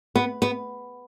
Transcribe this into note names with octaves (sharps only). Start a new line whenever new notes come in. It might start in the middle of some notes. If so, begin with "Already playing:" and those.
B3
B3